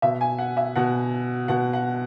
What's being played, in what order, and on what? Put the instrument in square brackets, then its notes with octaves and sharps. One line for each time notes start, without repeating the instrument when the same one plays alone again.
[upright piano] B2 E5
G#5
F#5
E5
B2 F#5
B2 F#5
F#5